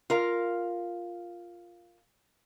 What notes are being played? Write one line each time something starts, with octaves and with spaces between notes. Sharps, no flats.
F4 A#4 F5